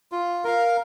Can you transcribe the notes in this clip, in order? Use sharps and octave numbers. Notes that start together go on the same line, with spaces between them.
F4
A#4 F5